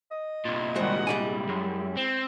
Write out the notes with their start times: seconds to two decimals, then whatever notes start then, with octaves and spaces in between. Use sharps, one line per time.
0.11 D#5
0.45 C2 A#2
0.76 D#3 G3 G#3 F#4 C5 F#5
1.07 G3 G#3 E4 D5 G#5
1.49 F#2
1.97 C4